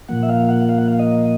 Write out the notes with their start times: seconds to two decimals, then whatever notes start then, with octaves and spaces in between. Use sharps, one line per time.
0.08 A#2 F3 A#3 F#5
0.23 E5
0.29 F5
0.49 F#5
0.69 F5
0.78 F#5
0.88 F5
0.99 D#5